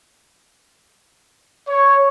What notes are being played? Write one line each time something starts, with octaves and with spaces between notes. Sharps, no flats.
C#5